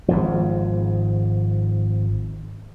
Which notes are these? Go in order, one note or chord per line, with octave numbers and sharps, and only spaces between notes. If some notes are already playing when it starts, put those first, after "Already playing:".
G#1 G#2 F3